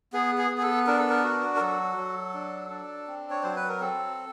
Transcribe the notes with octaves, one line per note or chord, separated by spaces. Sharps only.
B3 G#4
G#4
B3
G#4
A4
D4 A#4
A4
A#4
F#4
A#4
F#3 A4
F#3
D4
D4
C4
C#5
F#3 C5
B4
A#4
C4 A4